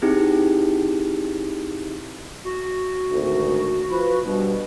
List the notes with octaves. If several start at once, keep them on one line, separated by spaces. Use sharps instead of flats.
C4 D#4 E4 G4 G#4
F#4
G#1 D2
F3 B4
G2 B2